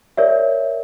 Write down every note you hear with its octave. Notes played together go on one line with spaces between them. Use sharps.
A#4 C#5 D5 E5